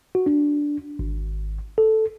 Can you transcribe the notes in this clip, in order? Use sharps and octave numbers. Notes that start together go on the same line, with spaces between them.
F#4
D4
G#1
A4